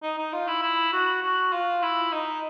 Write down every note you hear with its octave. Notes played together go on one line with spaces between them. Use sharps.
D#4
D#4
F4
E4
E4
F#4
F#4
F4
E4
D#4